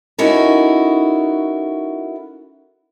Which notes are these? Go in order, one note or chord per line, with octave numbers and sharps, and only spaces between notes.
C#4 D#4 E4 F#4 A4 A#4